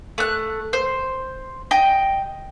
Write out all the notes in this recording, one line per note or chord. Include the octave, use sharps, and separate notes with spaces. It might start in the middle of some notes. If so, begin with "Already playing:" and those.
A3 F#6
C5
D#5 G5